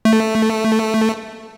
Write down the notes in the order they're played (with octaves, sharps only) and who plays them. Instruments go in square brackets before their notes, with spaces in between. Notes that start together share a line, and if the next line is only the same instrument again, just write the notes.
[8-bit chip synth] A3